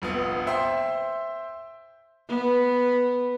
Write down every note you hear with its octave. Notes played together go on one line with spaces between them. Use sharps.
F1 A#1 B3
C5 E5 G5 C6
B3